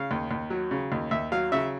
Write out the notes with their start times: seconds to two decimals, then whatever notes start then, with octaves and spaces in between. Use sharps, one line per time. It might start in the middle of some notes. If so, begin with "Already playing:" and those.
Already playing: C#3 F5
0.11 D#2
0.31 D#2
0.50 F#3
0.71 C#3
0.92 D#2
1.11 D#2 E5
1.32 F#3 F5
1.52 C#3 E5